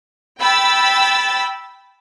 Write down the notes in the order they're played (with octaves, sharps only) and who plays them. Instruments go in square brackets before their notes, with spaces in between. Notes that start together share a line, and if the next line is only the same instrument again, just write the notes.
[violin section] G5 B5 E6 A6